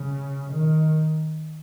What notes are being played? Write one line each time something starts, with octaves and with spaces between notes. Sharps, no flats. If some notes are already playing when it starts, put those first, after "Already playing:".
Already playing: C#3
D#3